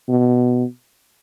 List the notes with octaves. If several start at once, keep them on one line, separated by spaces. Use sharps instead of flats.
B2